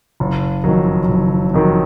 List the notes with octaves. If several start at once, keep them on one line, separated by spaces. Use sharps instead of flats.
F#1
F2 D#3 F#3
F#1
F2 D#3 F#3